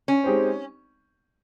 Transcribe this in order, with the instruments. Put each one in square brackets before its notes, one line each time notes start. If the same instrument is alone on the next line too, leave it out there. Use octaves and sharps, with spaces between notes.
[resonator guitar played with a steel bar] C#4
[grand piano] G#3 C4 D#4 G4 C5